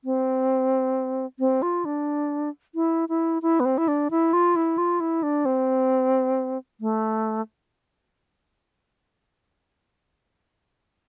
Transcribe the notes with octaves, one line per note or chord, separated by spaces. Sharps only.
C4
C4
F4
D4
E4
E4
E4
B3
C4
E4
D4
E4
F4
E4
F4
E4
D4
C4
A3